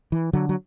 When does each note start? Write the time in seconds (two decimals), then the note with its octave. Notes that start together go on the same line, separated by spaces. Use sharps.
0.12 E3
0.33 D3 F#3
0.49 F#3